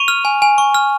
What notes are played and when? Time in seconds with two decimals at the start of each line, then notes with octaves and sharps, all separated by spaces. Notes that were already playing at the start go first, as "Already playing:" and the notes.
Already playing: C#6 D#7 F7
0.08 F6
0.25 G#5
0.42 G#5
0.58 C#6
0.75 F6